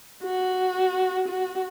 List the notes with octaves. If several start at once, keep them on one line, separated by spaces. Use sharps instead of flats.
F#4
F#4